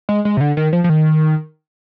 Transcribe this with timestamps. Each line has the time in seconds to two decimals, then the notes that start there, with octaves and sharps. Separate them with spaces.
0.09 G#3
0.25 G#3
0.37 C3
0.41 D3
0.57 D#3
0.73 F3
0.84 F3
0.89 D#3